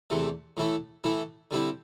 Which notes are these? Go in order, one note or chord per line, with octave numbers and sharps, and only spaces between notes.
E2 C3 E3 A3
A2 E3 A3 E4
A2 E3 A3 E4
D3 G3 C4 E4